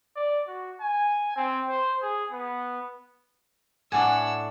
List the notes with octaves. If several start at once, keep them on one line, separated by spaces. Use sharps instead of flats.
D5
F#4
G#5
C4
C5
G#4
B3
A2 D4 F#5 G#5 E6